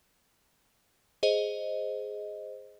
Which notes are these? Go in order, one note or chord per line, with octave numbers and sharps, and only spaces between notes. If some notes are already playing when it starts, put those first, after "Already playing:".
G#4 C5 D#5